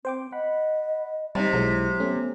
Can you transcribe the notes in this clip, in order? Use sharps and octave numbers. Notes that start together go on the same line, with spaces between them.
C4 C5 G5 D6
D#5 F#5 B5
C3 G3 D#4 A5
B1 F#3 G#3 E4
A3 B3 C#4